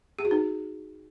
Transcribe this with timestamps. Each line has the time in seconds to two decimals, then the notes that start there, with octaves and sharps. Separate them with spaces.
0.19 G#4
0.25 F#4
0.31 D#4